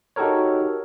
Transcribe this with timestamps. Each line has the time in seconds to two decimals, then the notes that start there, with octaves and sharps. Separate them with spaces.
0.16 D#4 F#4 G4 A4 A#4 C#5